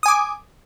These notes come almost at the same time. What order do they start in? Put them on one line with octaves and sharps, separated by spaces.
D#6 G#5 D6